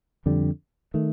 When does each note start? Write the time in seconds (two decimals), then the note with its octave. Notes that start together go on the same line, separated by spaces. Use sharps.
0.26 F2 D3 G3
0.94 D#3 A3